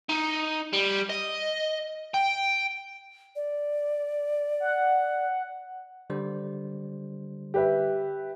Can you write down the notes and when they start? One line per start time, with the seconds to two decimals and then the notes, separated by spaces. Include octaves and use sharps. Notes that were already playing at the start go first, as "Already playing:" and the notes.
0.09 D#4
0.73 G3
1.10 D#5
2.14 G5
3.36 D5
4.60 F#5
6.10 D3 G3 C5
7.54 G4 B4 E5